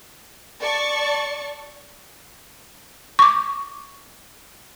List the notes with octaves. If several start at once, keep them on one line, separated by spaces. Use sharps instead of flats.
D5 A5 C#6
C#6 D6